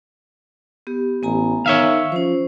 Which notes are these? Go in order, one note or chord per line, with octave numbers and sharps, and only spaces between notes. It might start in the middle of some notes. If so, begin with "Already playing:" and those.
B3 G4
A1 B3 G#5 A#5
D#3 C#5 E5 F5
F3 C#4 C5